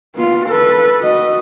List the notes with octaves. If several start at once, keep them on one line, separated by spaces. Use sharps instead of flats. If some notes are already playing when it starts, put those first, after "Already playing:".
B3 F4
A4 B4
F#4 D#5